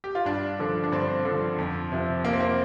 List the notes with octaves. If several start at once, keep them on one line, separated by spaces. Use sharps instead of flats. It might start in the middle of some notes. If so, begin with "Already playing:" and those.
G4
F4
G2 D4
D3 F3
D4
G2 C4
D3 F3
F2
C3 F3
F2 A#3
C4
A#3